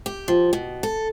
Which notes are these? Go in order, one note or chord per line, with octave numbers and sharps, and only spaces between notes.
G4
F3
B2
A4